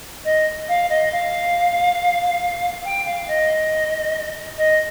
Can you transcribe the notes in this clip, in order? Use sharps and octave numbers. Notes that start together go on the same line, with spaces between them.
D#5
F5
D#5
F5
G5
F5
D#5
D#5